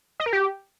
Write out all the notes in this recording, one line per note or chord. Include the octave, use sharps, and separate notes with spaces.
D#5
A#4
G4